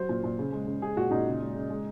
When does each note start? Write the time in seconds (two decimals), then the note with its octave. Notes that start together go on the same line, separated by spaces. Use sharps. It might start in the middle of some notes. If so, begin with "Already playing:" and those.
Already playing: F#3 C5
0.09 A#2
0.24 A#2
0.38 C#3
0.52 G#3
0.67 C#3
0.82 G#3 G#4
0.96 A#2 F#4
1.11 A#2 D#4
1.26 C#3
1.40 G#3
1.55 C#3
1.70 G#3